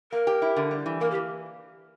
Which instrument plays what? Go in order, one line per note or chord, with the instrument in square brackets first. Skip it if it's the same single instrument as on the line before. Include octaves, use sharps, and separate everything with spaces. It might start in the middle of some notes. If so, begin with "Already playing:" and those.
[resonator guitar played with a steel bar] A#3 [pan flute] A#4
[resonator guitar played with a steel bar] G4
E4
D3
G3
E3
[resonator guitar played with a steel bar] A#3 [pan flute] A#4
[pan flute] G4
[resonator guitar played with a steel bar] E3